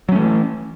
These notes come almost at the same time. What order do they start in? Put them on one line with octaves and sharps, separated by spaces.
F#3 C#4 A3 E3